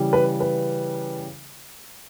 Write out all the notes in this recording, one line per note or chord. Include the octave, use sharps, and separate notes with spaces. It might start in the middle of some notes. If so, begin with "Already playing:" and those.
Already playing: C#3 E3 G3
B4
B4